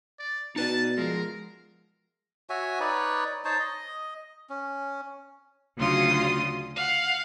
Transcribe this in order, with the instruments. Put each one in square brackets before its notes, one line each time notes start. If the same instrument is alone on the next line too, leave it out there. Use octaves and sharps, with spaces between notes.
[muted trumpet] D5
[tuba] B2 [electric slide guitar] D#4 B4 D5 [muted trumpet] A5
[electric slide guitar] F3 G#3 [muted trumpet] A#4
[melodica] F#4 C#5 E5 G#5
D#4 B4 C#5 D5
D#4 C5 C#5 A5
D#5
C#4
[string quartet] D2 C#3 F#3 F4 C6 D#6
F5 F#5